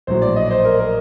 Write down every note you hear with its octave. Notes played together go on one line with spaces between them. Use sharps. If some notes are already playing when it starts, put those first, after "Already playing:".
A#1 A2 F#3 C5
D5
D#5
C5
A#4
A#4